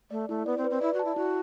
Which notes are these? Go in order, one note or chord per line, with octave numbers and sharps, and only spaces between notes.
A3 D5
A3 E4
B3 D5
C4
B4
C4
E4 D5
F#4
A5
E4
E4 F#4